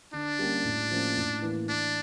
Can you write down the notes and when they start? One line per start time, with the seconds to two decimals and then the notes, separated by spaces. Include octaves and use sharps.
0.13 D3 D4
0.39 G3 A#3 C#4 G4
0.64 A2
0.91 F3 A#3 C#4
1.17 A2
1.42 E3 A#3 E4
1.68 E3 D4